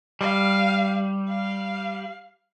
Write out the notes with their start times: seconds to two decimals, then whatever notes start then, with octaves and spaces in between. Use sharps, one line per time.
0.21 G3 F5
1.28 F5